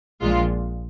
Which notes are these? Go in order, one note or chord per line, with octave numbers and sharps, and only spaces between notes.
A#1 A#2 F3 G#3 F4